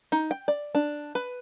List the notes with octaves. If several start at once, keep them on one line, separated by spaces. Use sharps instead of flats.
D#4
G5
D5
D4
B4